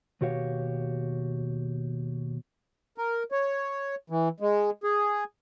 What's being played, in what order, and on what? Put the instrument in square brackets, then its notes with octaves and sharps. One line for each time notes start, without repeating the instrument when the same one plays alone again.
[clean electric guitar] D#2 B2 F#4 G4 C#5 F5
[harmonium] A#4
C#5
E3
G#3
G#4